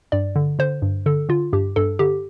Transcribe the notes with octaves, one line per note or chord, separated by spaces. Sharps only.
G2 D5
D3
D3 C5
G2
D3 A4
D3 F4
G2 G4
G2 A4
D3 G4